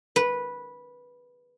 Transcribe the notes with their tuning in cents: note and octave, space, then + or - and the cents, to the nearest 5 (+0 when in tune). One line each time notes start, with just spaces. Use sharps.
B4 -10